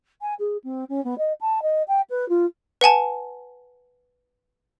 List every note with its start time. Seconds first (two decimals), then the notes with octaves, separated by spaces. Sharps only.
0.21 G#5
0.39 G#4
0.64 C4
0.89 C#4
1.04 B3
1.18 D#5
1.41 A5
1.62 D#5
1.88 G5
2.10 B4
2.29 F4
2.81 B4 F#5 G#5 A5